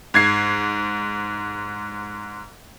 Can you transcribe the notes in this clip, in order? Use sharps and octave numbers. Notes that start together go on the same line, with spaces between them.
G#2 G#6 C7